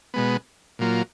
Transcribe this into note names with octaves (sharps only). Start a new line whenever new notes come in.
B2 G#3 B3
A#2 F#3 A#3 F4